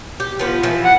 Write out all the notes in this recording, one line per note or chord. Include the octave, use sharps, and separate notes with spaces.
G4
F3 B3 F4
E3 F3
F#5